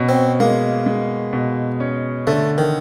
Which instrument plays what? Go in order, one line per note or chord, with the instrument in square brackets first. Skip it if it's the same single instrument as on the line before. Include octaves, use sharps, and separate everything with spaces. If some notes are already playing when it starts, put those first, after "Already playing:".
Already playing: [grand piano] B2 C#4
[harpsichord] C4
[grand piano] G#3 [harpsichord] A#3
[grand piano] G#3
B2
C#4
[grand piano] D3 [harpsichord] A3
[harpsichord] D#3